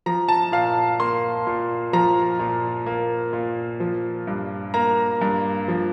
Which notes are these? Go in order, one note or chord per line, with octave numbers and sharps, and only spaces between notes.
F3 A#5
A5
A#2 F5
A#3 C6
A#2
F3 A#5
A#2
A#3
A#2
F3
G2
A#3 A#5
G2
F3